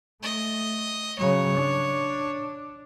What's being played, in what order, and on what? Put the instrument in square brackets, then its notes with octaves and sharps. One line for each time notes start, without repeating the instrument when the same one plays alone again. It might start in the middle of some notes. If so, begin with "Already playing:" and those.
[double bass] A3 [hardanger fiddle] D#5
[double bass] C#3 F#3 [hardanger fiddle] C#5
[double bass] D4